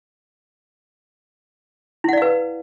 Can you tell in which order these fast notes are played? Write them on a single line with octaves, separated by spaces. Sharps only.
E4 F#5 D5 F5 B4